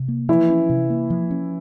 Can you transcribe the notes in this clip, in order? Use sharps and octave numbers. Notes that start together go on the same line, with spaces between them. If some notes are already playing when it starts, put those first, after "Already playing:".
Already playing: C3
A#3
E3 F3 E4
C#4
C3
A#3
F3
C#4